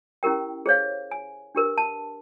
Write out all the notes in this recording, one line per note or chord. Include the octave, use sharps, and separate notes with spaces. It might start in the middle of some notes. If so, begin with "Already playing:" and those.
C#4 E4 G4 A#4 G5
G#4 C5 C#5 F5
G#5
D4 G4 A#4 B4
A5